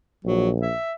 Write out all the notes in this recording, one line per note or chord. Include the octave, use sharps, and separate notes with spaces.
A#1 F#3
E5